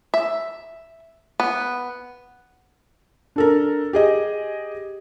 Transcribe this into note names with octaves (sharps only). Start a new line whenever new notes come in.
E5
B3
D4 A4 A#4
G4 G#4 D#5